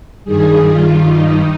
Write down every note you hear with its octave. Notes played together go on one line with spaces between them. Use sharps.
G2 D#3 G3 G#4
F4
D#4